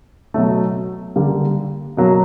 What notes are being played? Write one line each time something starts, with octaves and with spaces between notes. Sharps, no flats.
B2 F#3 A3
D3 G3 A#3
B2 F#3 A#3